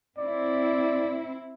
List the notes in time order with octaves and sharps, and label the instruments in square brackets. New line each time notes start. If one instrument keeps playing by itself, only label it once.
[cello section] C4 E4 [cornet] D5